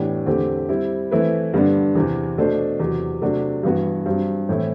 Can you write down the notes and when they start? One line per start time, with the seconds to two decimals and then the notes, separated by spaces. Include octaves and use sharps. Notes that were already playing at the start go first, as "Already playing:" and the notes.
Already playing: A2 E3 B3 D4 G4
0.26 E2 D3 A3 C4 G4
0.69 G3 C4 E4
1.11 E3 A3 C4 E4 B4
1.54 G2 D3 G3 B3 D4
1.95 E2 C3 E3
2.38 B2 A3 D4 A4 C5
2.80 E2 C3 F#3
3.22 C3 F#3 A3 D4 F#4
3.63 G2 E3 B3 F#4
4.06 G2 F#3 C4 G4
4.49 A2 E3 A3 C4 E4